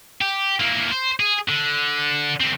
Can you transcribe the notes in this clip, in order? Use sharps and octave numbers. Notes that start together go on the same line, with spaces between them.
G4
E3 A#3
C5
G#4
D3
D3 C4